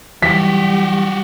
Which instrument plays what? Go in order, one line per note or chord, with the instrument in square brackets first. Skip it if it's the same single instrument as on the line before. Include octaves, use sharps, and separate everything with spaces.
[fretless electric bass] E3 F#3 [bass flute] G3 [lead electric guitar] F#4 G4 [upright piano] B6